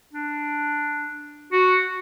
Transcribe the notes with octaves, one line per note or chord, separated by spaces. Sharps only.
D4
F#4